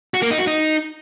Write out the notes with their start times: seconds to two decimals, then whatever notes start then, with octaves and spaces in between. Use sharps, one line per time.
0.14 F#4
0.22 A#3
0.31 D#4
0.39 F#4
0.47 D#4